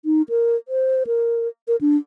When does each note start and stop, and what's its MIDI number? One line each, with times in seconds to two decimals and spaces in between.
0.05 0.22 63
0.29 0.56 70
0.68 1.04 72
1.07 1.48 70
1.68 1.76 70
1.81 1.97 62